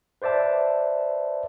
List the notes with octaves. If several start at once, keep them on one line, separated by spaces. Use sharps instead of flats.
B4 C5 D5 E5 A5